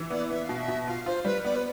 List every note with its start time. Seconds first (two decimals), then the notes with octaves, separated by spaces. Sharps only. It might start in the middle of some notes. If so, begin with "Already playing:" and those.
Already playing: E3
0.10 B3 D5
0.30 B3 E5
0.44 F5
0.49 B2
0.57 E5
0.68 B2
0.87 F4 F5
1.06 F4 C5
1.25 G3 B4
1.44 B3 D5
1.55 B4